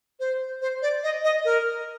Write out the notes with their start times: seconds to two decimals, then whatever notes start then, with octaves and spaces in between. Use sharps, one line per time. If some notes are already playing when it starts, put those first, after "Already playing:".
0.20 C5
0.62 C5
0.82 D5
1.03 D#5
1.24 D#5
1.45 A#4